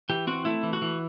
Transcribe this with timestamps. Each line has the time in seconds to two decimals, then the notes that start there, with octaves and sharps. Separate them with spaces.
0.09 E3 G4
0.27 C4 F#4
0.45 A3 E4
0.63 E3
0.73 F#4
0.82 E3